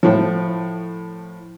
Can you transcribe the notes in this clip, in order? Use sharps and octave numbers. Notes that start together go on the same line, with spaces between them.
A2 F3